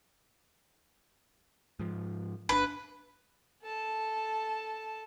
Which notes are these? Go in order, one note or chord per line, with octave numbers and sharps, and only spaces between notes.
G#2 F3
G1 D4 B4
A4 A5